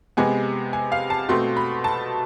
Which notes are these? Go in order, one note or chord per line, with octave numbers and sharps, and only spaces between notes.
C3 G#3 B3 G#5
G#5
F5
A5
B2 A3 C4 C6
B5
A5